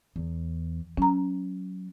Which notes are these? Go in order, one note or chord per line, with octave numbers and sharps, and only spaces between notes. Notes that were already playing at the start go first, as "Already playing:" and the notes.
E2
F#3 C#4 A#5